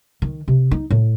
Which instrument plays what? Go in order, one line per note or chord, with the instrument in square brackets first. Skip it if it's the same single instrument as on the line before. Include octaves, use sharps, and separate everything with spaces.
[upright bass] D#3
C3
D#4
A2